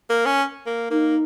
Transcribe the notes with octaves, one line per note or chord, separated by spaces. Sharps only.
A#3
C#4
A#3
A#3 D#4